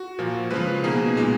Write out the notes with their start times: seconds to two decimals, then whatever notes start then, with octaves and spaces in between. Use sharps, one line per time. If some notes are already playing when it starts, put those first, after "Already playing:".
Already playing: F#4
0.19 A#2 F3 A#3
0.51 C#3 F3 G#3 B4
0.83 B2 A#3 D#4 G#4
1.16 A#2 G#3 D#4